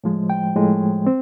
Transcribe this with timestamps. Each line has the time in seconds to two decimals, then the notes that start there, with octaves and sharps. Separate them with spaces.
0.04 A2 F3 G#3
0.30 G5
0.55 A2 F3 G#3
1.07 C4